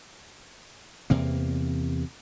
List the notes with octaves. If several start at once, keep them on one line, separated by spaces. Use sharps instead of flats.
E2 C3 A#3